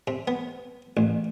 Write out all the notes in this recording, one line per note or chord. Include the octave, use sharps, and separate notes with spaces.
C3
B3
A1